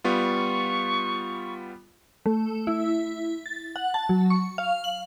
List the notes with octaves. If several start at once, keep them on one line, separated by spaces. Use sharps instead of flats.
G3 B3 F4 C#6
A3
E4
A6
F#5
A5
F#3
C#6
F5
F#7